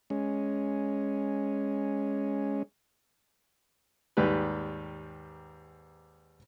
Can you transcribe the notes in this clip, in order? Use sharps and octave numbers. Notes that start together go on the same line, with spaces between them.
G#3 C#4
D#2 G#2 G3 G4 B4